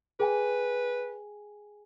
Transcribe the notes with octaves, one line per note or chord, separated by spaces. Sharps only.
G#4 B4 G5 G#5